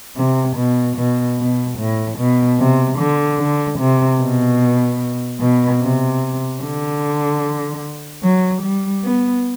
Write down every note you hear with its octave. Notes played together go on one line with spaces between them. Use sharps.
C3
B2
B2
B2
A2
B2
C3
D3
D3
C3
B2
B2
C3
D3
F#3
G3
B3